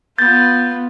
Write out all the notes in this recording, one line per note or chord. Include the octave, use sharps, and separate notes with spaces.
B3 F4 G6 A6